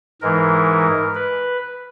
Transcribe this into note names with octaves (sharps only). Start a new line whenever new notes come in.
G#2 E3 G#3 A#4
B4